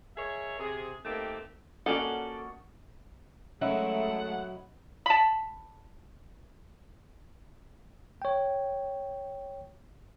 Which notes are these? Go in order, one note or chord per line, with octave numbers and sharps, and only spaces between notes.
G#4 A#4 C#5 D#5 E5
C3 G#4
A3 A#3 C4 D#4 G4
A#3 C#4 F#4 A4 D5 D#5 F#5
F#3 G#3 A3 C#4 D#4 E4 F#5
A5 B5
C#5 G5